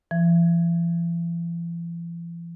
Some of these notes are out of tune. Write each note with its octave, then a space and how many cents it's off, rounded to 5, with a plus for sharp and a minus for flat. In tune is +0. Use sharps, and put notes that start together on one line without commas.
E3 +45